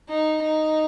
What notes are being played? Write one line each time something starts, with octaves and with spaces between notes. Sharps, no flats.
D#4
D#4